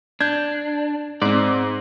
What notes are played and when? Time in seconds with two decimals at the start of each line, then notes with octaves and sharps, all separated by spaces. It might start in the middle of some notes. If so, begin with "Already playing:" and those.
0.21 D4 G6 G#6
1.22 G#2 C4 D5